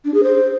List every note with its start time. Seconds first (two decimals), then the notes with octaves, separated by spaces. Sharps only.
0.05 D4
0.14 G#4
0.23 C5